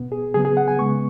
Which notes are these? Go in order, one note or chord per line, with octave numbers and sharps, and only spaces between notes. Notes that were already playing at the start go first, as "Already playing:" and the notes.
Already playing: B2 B3
G#4
C#3 F#3 B3 G#4
G#4
F#5
G#5
C#3 G#3 B3 C#6